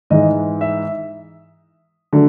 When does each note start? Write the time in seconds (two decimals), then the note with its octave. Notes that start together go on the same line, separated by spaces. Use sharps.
0.10 G#2 E3 G#3 D#5
0.61 E5
2.13 D3 F#3 A3